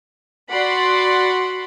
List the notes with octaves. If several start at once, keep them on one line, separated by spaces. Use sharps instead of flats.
F#4 D5 F#5 B5 C6